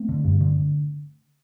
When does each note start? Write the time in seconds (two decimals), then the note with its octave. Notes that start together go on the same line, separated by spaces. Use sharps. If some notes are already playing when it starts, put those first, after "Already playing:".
Already playing: A3 C4
0.09 D3
0.24 G2
0.41 D3